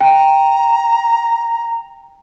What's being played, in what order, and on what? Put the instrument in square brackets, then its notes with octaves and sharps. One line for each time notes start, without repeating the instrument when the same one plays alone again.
[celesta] G5 [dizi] A#5